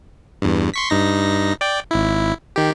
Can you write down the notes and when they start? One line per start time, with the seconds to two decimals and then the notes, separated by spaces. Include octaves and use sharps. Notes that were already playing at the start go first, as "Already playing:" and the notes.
0.42 E2 G2
0.74 C6 C#6 B6
0.90 G2 D#4 A#6
1.61 D5 G5
1.91 G#1 E4
2.56 D#3 G4